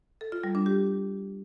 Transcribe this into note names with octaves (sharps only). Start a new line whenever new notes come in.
A4
F4
G3
D4
G4